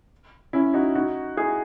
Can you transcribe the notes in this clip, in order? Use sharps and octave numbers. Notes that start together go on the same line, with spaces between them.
C#4 E4
D#4 F#4
D#4 F#4
E4 G#4